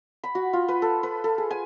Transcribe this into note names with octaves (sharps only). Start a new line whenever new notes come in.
B5
F#4
F4
B4
A4
B4
A4
G#4
G#5